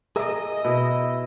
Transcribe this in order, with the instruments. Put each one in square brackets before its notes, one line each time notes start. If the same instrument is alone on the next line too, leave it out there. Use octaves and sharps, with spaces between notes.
[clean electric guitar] G#4 A#4 E5 [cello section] D#5
[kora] B2 [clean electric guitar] E4